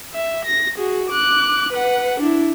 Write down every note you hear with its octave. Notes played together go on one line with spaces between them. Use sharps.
E5
A#6
F#4 G#4
D6 F#6
B4 F#5
D4 E4